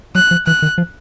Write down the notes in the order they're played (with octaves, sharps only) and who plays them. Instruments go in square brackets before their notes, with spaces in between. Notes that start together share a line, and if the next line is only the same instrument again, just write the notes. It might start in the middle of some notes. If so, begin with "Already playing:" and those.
[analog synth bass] F#3 [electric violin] F#6
[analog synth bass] F3
[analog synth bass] E3 [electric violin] F#6
[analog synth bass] D#3
F3